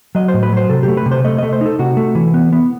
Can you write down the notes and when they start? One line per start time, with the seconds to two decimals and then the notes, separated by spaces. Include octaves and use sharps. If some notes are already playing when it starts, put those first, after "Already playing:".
0.15 F#3 D#5
0.28 C5
0.34 A2
0.43 B4
0.52 F#3 C5
0.69 C3 A4
0.83 G4
0.88 A3
0.97 B4
1.06 C3
1.12 C5
1.24 A3 D#5
1.38 A3 D#5
1.53 C5
1.61 D#4 A4
1.79 C3 F#4
1.97 A3
2.15 E3
2.34 B3
2.53 B3